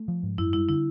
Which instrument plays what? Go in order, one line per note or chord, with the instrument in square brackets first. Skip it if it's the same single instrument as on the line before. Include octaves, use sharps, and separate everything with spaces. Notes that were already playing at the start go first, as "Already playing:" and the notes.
Already playing: [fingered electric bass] A3
F3
G#2
[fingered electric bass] F#2 [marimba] E4
[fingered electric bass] G3 [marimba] E4
[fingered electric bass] D3 [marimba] E4